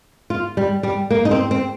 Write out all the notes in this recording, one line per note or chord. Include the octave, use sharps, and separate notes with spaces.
F4
G3
G3
A#3
D#4
C4
C4